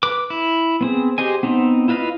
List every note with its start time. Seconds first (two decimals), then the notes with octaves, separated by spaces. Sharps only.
0.03 B4 D6
0.30 E4
0.81 B3 C4 G#4
1.18 G4 G#4 C5 D#5 G#5
1.43 B3 C4 D#4
1.88 E4 F4 B4 D#5 F5